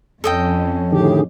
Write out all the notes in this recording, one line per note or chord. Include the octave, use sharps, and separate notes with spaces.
F2 C#4 A4 D#5 G5
A2 D3 D#3 G4 G#4